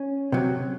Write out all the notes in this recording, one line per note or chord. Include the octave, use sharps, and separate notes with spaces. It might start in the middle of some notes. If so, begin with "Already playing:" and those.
Already playing: C#4
C3 F#3